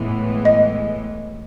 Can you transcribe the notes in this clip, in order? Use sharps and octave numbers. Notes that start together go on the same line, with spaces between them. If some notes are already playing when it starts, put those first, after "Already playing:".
Already playing: A2 E3 G#3 B3
D#5